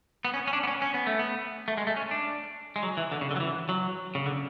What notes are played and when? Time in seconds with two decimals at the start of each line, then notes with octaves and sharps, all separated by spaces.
0.25 B3
0.34 C#4
0.47 C#4
0.53 D4
0.63 B3
0.67 C#4
0.82 C#4
0.94 B3
1.07 A3
1.19 B3
1.68 A3
1.77 G#3
1.87 A3
1.97 C#4
2.11 D4
2.76 G#3
2.83 F#3
2.97 E3
3.12 D3
3.21 C#3
3.31 D3
3.36 F#3
3.40 E3
3.69 F#3
4.15 C#3
4.26 D3